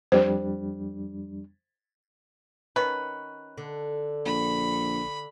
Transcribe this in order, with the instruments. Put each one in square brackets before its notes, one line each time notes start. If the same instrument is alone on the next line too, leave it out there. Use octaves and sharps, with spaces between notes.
[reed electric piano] F2 G3 D4 [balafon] C5
[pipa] D#3 B4 [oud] C#4
[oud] D3
[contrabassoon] A#1 [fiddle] B5